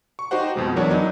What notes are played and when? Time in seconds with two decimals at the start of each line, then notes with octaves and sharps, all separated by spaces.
0.19 C#6
0.31 D#4 F#4 G4 C5 F#5
0.56 F2 B2 G#3
0.76 E2 F#3 D4 A#4 C#5
0.91 F#3 D#4 E4